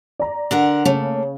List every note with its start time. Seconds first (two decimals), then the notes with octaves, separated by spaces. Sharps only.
0.20 D5 A#5
0.51 D3 A#4 F#5
0.85 C#3 A3 A#3 C#4